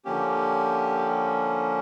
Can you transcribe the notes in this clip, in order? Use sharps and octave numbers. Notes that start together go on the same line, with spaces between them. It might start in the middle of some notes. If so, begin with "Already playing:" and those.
D3 F3 A#3 C#4 G4